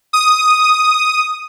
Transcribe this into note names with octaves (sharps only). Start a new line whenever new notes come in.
D#6